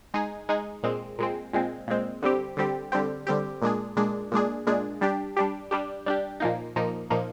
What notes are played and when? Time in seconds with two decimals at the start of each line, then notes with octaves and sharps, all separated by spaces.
0.14 G#3 D#4 G#4
0.49 G#3 D#4 G#4
0.83 A#2 G#3 C4
1.18 A#2 G#3 C4
1.53 A#2 G#3 C4
1.88 A#2 G#3 C4
2.22 D3 G3 C4 G4
2.57 D3 G3 C4 G4
2.92 D3 G3 C4 G4
3.27 D3 G3 C4 G4
3.62 A#2 G#3 D4 G#4
3.96 A#2 G#3 D4 G#4
4.32 A#2 G#3 D4 G#4
4.67 A#2 G#3 D4 G#4
5.01 G3 D4 G4
5.37 G3 D4 G4
5.71 G3 D4 G4
6.06 G3 D4 G4
6.40 A#2 F3 A#3 D#4
6.76 A#2 F3 A#3 D#4
7.10 A#2 F3 A#3 D#4